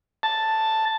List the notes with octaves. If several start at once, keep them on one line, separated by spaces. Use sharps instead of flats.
A5